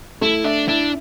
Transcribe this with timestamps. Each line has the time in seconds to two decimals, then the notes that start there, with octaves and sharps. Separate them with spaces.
0.21 A3 E4
0.44 D4 E5
0.68 D4 E4